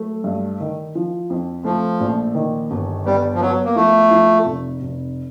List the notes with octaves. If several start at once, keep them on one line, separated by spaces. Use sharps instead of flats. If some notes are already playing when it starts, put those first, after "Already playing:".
Already playing: F#3 A3
G2
D#3
F3
F2
F3 A3
A#1
D#3
G1
G3 B3
F3
F#3 B3
A#3
F3 A3
F3
F1
F1